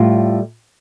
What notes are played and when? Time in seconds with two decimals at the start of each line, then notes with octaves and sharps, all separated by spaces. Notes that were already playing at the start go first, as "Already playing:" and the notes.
Already playing: A2 G3 F4